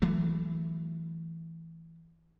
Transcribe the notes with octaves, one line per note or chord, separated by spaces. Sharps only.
E3 F#3 A3